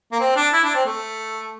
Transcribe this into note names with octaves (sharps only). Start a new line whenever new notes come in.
A#3
C4
D4
E4
D4
C4
A3